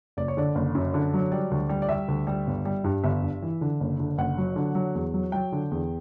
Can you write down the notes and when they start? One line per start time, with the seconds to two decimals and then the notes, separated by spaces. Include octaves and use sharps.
0.17 F#1 D5
0.28 C#5
0.37 D3 D5
0.55 F#1
0.75 F#2
0.94 D3
1.13 F#3
1.32 G3 D5
1.51 D2
1.69 G3
1.82 D5
1.89 G3 E5
2.08 D2
2.27 G3
2.47 G1
2.65 G3
2.84 G2
3.04 G1 E5
3.23 G2
3.42 E3
3.61 D3
3.80 F#1
3.99 D3
4.18 F#1 F#5
4.38 F#3
4.56 D3
4.75 F#3
4.95 E2
5.14 F#3
5.32 F#3 G5
5.52 D3
5.71 E2